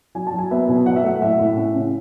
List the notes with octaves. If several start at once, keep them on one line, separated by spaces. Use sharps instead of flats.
F#3 G#5
A5
F#3
G#5
B3 E5
B2
F#3 F#5
E5
A3 F#5
A2 E5
A2
C#4
C#3